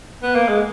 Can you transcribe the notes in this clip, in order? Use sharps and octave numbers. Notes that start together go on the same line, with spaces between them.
B3
A#3
G#3